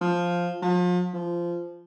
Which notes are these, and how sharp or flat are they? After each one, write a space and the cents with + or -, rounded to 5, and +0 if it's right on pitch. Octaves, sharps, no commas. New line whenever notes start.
F3 +5
F3 +35
F3 -15